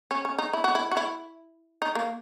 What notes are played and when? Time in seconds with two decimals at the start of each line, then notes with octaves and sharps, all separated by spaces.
0.11 C#4
0.25 C#4
0.38 D#4
0.53 E4
0.64 F#4
0.75 E4
0.91 F#4
0.97 E4
1.82 D#4
1.95 A#3